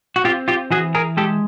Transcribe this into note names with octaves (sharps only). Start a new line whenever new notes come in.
F#4
C4 F4 G4
F4 G4
E3 F#4 G#4
G#4 A#4
G#3 G4 A4